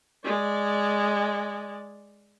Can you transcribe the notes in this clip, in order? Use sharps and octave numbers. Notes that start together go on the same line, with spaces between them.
G#3 D5